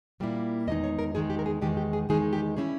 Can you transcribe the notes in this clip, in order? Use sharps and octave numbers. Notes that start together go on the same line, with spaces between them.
A#2 G3 A#3 E4
E2 D#3 G#3 D#4 D#5
C#5
A#4
E2 D#3 G#3 D#4 G#4
G4
A#4
G#4
E2 D#3 G#3 D#4 G4
G4
G#4
E2 D#3 G#3 D#4 G#4
G4
G3 C#4 E4 G#4